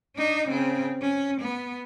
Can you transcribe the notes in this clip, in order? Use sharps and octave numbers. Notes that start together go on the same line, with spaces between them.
D4 D#4
C#3 C4
C#4
B3